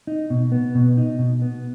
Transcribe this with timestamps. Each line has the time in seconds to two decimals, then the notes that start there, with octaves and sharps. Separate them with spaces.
0.07 D#4
0.30 B2
0.52 B3
0.75 B2
0.97 D#4
1.19 B2
1.42 B3